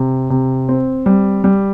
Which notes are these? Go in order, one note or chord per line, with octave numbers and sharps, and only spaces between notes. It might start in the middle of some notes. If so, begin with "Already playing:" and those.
Already playing: C3
C3
C4
G3
G3